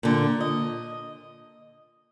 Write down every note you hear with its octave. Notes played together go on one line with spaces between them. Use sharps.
A#2 D3
D#5